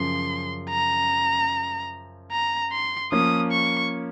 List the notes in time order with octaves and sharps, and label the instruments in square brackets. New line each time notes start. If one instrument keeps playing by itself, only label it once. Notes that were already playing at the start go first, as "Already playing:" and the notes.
Already playing: [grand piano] F#2 C#3 F3 [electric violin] C6
[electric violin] A#5
A#5
C6
[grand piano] F3 A#3 C#4 [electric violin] D#6
[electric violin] C#6